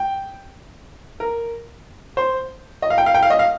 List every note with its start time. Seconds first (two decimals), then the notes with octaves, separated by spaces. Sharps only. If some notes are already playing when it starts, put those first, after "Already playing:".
Already playing: G5
1.20 A#4
2.17 C5
2.82 D#5
2.90 F5
2.98 G5
3.06 F5
3.14 G5
3.23 F5
3.30 D#5
3.39 F5